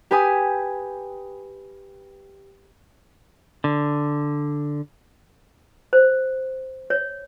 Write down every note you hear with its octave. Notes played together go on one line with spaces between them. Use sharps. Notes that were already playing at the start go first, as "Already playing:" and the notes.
G4 B4 G#5 D#6
D3
C5
C#5